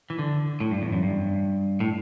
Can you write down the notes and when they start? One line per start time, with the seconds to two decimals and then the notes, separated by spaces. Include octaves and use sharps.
0.10 E3
0.19 D3
0.60 A2
0.71 G2
0.82 E2
0.92 F#2
1.03 G2
1.80 A2